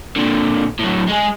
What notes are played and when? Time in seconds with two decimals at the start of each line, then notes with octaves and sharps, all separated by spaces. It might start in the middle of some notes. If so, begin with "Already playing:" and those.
0.16 A#2 D3
0.79 A2 F#3
1.08 G#3 G#4